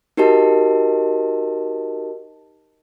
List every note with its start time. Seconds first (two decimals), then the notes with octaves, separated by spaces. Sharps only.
0.17 D#4 F#4 G4 A#4 D#5 A5